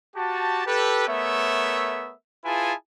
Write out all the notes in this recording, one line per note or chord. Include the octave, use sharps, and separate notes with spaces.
F#4 G4 A5
G4 A4 B4
A3 B3 A#4 C#5 E5
E4 F4 G#4 B4 G#5 A5